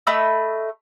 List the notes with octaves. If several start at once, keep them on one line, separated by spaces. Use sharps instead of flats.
A3 D#5 B5 E6